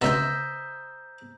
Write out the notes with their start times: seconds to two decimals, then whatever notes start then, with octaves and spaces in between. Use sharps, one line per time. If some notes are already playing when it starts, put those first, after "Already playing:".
0.02 C#2 B2 C5 D#5 E5 A#5 G6